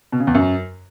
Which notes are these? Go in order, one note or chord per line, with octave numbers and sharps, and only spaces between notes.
B2
C#3
E2
F#2